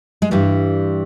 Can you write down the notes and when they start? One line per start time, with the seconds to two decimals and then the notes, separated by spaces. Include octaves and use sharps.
0.22 G#3
0.31 G2 E3 G3